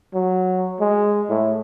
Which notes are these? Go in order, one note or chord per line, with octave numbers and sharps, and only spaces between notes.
F#3
G#3
A2